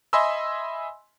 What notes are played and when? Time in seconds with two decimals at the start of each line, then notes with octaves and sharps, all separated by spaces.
0.13 D#5 E5 G#5 B5 C6 E6